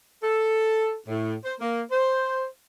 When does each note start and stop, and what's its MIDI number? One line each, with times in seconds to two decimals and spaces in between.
0.22 0.95 69
1.08 1.34 45
1.44 1.54 72
1.60 1.81 58
1.91 2.45 72